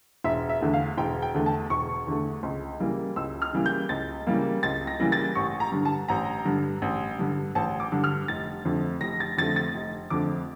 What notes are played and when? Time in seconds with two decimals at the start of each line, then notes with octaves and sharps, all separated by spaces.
0.24 E1 E5
0.49 E5
0.61 E2 D3 A3
0.73 F5
0.98 E1 G5
1.22 G5
1.34 E2 D3 A3
1.46 A5
1.70 E1 C#6
2.07 E2 D3 A3
2.43 C#2
2.80 C#3 E3 G3 A#3
3.16 C#2 E6
3.42 F6
3.53 C#3 E3 G3 A#3
3.66 G6
3.89 C#2 A6
4.27 C#3 E3 G3 A#3
4.63 C#2 A6
4.87 A#6
4.99 C#3 E3 G3 A#3
5.12 A6
5.35 A1 C#6
5.60 A#5
5.72 G2 D3
5.85 A5
6.08 A1 A#5
6.45 G2 D3
6.82 A1
7.19 G2 D3
7.55 A1 A5
7.80 D6
7.92 G2 D3
8.04 F6
8.28 F1 A6
8.65 F2 D3 A3
9.01 F1 A#6
9.20 A6
9.37 F2 D3 A3 A6
9.56 A6
9.74 F1
10.10 F2 D3 A3 D6